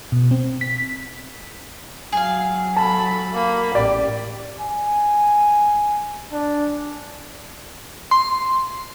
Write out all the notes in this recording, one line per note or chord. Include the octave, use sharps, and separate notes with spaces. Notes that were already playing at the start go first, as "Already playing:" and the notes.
B2
C4
B6
F#3 G#4 F5
A4 A5 B5
A#3 B5
A1 G4 D5
G#5
D4
C6